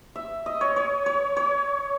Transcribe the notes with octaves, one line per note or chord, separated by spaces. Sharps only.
E5
D#5
C#5
C#5
C#5
C#5